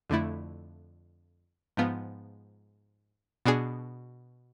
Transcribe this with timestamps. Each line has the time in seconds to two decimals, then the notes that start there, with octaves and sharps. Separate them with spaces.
0.10 F2 D3 A3 E4
1.77 G#2 F3 B3 F4
3.45 B2 B3 D4 G#4